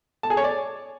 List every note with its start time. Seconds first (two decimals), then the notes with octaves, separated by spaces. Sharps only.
0.23 A5
0.30 G#4
0.37 C#5
0.44 D5